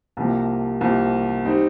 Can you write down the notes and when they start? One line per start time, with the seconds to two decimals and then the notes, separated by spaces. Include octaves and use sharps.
0.17 C2 C3 F3 A#3
0.81 C2 C3 F3 A#3
1.45 G3 C4 D#4